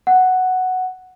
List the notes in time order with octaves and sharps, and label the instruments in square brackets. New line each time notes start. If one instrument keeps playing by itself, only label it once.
[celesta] F#5